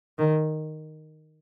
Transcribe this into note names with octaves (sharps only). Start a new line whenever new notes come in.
D#3